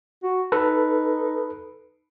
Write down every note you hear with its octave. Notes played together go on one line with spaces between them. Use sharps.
F#4
D#4 A4 B4